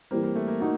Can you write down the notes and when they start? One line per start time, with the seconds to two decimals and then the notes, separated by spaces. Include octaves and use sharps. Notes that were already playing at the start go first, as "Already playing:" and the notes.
0.11 E3 G3 A#3 C4
0.23 A#3
0.36 A3
0.48 A#3
0.60 A3 D#4 F#4